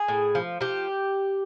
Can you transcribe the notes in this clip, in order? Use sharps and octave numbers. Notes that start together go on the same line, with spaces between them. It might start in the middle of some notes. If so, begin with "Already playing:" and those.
Already playing: G#4
A2
F3
F3 G4